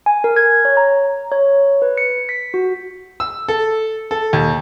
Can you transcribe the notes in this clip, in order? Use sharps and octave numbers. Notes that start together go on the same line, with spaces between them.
G#5
A#4
G#6
C#5
A#5
C#5
B4
C#7
B6
F#4
E6
A4
A4
D#2